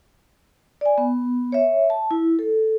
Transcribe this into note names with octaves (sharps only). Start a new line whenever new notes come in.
D5 G#5
B3
C#5 E5
A5
E4
A4